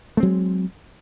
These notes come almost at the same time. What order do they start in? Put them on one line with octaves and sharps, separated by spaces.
A3 C4 F#3 G#3